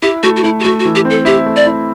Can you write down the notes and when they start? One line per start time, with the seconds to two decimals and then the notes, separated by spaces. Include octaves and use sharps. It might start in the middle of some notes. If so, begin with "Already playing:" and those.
0.02 E4 G4
0.23 A3 F#4
0.36 F#4
0.44 A3 E4
0.60 G4
0.64 A3 F#4
0.80 F#4
0.85 E3
0.95 G4
1.05 C4
1.10 A4
1.25 E4 G4
1.46 A3
1.56 D5
1.66 E4